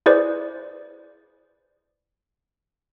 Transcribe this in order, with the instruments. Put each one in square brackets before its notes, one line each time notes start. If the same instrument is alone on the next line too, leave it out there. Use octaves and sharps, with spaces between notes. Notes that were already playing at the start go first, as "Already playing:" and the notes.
[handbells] E4 G#4 B4 C5 D5